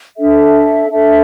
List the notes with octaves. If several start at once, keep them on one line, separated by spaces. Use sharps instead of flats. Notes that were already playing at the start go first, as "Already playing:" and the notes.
D4 A4 E5
D4 A4 E5